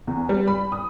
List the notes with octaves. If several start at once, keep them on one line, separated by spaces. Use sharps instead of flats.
E2
G3
B5
D#6